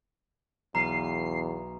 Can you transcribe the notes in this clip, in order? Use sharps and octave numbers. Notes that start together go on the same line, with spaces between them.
B1 E2 F5 A#5 C7 D#7